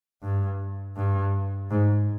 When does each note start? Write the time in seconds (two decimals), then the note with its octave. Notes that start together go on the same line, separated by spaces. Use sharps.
0.23 G2
0.97 G2
1.71 G#2